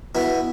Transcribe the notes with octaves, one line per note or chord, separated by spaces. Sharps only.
B2 E4